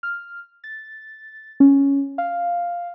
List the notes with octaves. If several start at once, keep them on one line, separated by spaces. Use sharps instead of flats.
F6
A6
C#4
F5